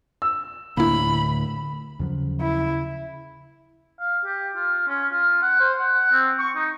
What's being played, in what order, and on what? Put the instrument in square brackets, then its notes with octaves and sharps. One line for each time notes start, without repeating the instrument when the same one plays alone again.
[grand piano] E6
[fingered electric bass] D2 A2 D3 [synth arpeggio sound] A#3 E4 [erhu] B5
[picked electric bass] D#2 F3 F#3 [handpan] C#3
[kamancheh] E4
[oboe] F5
G4
F4
C#4
F4
F#5
C5
F#5
F#5
C4
C#6
D#4